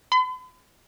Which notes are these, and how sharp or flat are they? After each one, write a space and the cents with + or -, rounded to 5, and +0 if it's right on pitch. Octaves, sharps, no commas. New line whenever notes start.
B5 +45